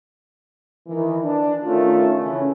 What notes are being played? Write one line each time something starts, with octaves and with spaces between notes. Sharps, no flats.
D#3 E3
D4
D#3 A3 C#4 F4
C#3 E3 C#4